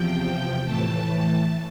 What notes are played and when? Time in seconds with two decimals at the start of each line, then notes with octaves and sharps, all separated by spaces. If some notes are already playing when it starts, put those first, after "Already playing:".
Already playing: E2 C3 F3 G5
0.66 A2 E3 A3 A5